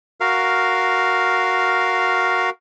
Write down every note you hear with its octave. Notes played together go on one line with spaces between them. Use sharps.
F#4 A#4 F5